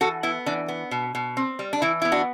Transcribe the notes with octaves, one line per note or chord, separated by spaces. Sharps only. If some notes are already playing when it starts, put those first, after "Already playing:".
E3 F#4 A4
B3 E4
E3 D4
B3
B2
B2
C4
G3
D4
E3 E4
B3 E4
D4 F#4